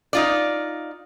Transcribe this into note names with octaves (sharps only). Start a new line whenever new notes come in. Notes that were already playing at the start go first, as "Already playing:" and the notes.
D#4 F4 D5